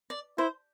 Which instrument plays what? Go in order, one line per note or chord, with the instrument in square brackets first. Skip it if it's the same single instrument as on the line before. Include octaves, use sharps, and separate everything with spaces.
[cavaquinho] D5
[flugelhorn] E4 [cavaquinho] C5